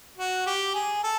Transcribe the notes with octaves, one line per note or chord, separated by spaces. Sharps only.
F#4
G4
G#4
A4